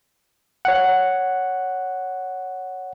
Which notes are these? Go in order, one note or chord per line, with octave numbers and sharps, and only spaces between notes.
C#5 F#5